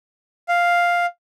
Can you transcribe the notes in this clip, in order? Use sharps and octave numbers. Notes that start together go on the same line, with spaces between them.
F5